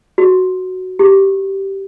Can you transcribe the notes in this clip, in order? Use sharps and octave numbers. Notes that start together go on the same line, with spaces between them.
F#4
G4